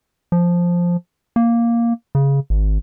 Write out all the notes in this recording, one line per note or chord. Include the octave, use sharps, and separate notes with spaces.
F3
A#3
C#3
G#1